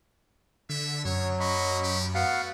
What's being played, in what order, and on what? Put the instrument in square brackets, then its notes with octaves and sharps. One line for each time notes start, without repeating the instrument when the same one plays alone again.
[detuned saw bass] D3 [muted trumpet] E5
[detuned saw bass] F#2 [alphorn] F#3 [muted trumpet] C#5
[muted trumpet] A#3 [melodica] D#5 B5 C#6
[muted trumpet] G4
[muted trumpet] A3 [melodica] B3 F5 F#5 [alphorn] F#4